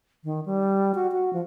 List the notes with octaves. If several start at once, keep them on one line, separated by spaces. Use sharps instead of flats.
D#3
G3
F#4
F#4
F3